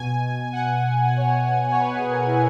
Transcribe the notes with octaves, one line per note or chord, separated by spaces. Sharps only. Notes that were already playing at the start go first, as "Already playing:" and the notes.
Already playing: B2 G#5
F#5
C#5
C#5
B4
G#4
A#4
E4